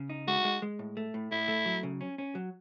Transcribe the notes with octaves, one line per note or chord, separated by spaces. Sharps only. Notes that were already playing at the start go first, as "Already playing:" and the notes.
Already playing: C#3
D#4
G#3 F#4
G#3
G#3
A2
A3
A2
A2 E4
A3
F#3
C#3
C#4
C#4
F#3